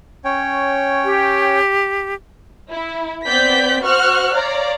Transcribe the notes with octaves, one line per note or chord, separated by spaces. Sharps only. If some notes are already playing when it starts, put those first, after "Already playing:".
C#4 C#5 G5
G4
E4
B3 C4 D5 G6 B6
F#4 C5 F#5 C#6 F6 F#6
C#5 D5 F5 A#5